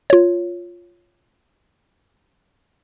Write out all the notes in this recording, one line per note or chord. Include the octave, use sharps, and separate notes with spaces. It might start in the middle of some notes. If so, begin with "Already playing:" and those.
F4 C#5